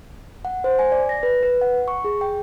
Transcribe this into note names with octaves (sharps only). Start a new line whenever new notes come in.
F#5
C5
G#5
D5
A#6
B4
B4
F#5
C#6
G#4
G5